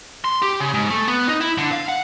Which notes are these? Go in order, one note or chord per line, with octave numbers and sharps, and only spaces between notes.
C6
G4
C#3
G#2
A3
B3
D#4
E4
D3
F5
F#5